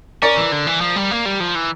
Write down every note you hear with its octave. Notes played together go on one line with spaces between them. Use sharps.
C#4 A#4 D5
E3
D3
E3
F3
G3
A#3
G3
F3
E3